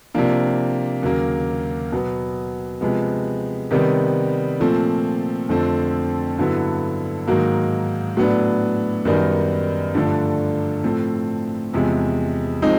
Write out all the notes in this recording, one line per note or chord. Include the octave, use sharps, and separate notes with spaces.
C3 F3 A#3 D4
D#2 C#3 F#3 A#3
B2 F#3 B3
C3 F3 G#3 B3
C3 D#3 G3 B3
A#2 F3 A3 C4
F2 D3 F3 A3 C4
G2 D3 F#3 B3 E4
G#2 D#3 F#3 A#3
A2 F#3 B3 D4
F#2 D#3 G3 B3 D#4
G2 D3 F3 A3 D4
A2 F3 A3 C4
E2 C3 F3 G#3
F3 G#3 C4 D#4